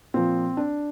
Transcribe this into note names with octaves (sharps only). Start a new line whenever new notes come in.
A#2 F3 C4
D4